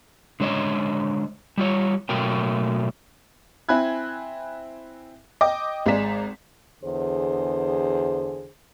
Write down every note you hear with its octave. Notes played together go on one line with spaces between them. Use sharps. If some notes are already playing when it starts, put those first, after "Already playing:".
D3 G#3 C5 C#5 D#5
G3 F4 C#5
B2 F#3 A3 A#3 A#4 G5
C4 E4 G#5 B5 F#6 G#6
D#5 G5 D6
G#1 G#3 D5 A#5 B6 E7
E2 D3 G#4 C5